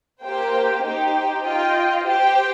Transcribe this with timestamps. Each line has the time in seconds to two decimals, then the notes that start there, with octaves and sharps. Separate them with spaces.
0.22 A#3 G4 C5 G5
0.82 D#4 G4 C5 G5
1.44 F4 D#5 G5
2.05 G4 C5 G5